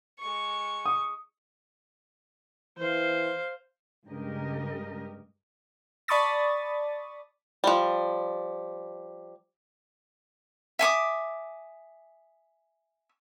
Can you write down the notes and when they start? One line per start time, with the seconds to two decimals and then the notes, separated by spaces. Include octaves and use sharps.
0.19 G#3 C#6
0.86 D#6
2.78 E3 C5 F5
4.08 G2 C#3 G#3 G4 A#4 D#5
6.08 D5 A5 B5 C#6 D#6 A6
7.64 F3 G3
10.79 E5 G#5 D6 D#6